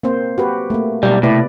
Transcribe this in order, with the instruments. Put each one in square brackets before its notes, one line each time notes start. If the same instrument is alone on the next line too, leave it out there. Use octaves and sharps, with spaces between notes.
[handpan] A#3 C4 C5
F#4 G4 B4
A3 A#3
[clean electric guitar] B1 G3 [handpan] B2
[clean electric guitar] A2 [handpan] C3 B4 D5